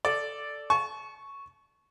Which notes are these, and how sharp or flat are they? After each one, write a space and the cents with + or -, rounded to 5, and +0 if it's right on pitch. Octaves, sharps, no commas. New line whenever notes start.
A4 +0 D5 +0
A5 -35 C#6 +0